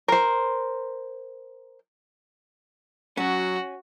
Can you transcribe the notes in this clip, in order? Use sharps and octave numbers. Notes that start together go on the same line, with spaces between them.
A#4 C5
F#3 C#4 F#4